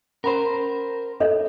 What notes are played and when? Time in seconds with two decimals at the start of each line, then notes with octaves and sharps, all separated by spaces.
0.24 C#4 A#4 C5 B5
1.20 A4 C#5 D#5